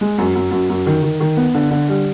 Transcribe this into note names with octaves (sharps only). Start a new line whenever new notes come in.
G#3
F#2
F#2
F#2
F#2
D#3
D#3
D#3
B3
D3
D3
G3